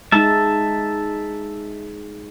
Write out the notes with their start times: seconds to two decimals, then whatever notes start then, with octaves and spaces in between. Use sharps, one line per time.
0.12 G#3 D#4 E5 A5